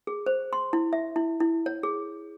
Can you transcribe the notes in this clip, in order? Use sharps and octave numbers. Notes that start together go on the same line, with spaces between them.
G#4
C5
C6
E4
E5
E4
E4
C#5
G#4